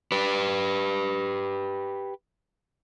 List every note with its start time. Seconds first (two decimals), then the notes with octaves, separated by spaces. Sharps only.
0.12 G4 B4